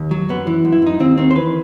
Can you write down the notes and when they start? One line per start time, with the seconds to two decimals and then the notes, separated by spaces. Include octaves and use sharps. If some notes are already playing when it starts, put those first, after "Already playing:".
Already playing: D#2
0.11 F#3
0.29 F#2 B3
0.47 E3
0.65 F#2
0.72 E4
0.82 F#2 D#4
1.00 D#2 C4
1.18 D#3 C4
1.31 C5
1.35 E3 B4